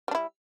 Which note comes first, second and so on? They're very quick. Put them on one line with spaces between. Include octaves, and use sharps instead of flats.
G3 D4 E4